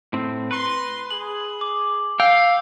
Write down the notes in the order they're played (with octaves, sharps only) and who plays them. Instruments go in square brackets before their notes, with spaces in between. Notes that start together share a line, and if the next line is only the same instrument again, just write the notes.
[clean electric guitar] A2 C4
[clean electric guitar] B4 [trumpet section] A#5 C6
[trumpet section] G#4 [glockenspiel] F#7
[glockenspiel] D6
[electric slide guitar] F5 [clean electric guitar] G5 [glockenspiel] E6